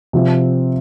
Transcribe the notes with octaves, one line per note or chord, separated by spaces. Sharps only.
C3 F3 C4